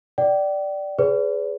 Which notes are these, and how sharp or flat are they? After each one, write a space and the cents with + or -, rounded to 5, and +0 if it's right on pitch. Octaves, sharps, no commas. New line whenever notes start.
D5 +0 G5 -35
G#4 +0 B4 +30 D5 -40